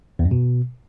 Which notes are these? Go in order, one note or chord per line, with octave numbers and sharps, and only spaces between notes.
E2
F#2
B2